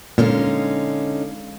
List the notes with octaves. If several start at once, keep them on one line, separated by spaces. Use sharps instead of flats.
A#2 D3 G#3 C#4 D#4 F5